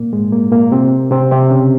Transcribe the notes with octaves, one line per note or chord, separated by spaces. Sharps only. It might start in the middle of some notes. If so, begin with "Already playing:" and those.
Already playing: A#2 A#3
G#2 G#3
A#2 A#3
A#2 A#3
C3 C4
C3 C4
C3 C4
C#3 C#4